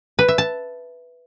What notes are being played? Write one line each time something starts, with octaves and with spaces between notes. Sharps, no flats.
B4
E5
A5